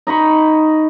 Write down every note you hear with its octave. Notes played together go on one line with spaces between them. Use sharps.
D#4 D#5 B5 C#6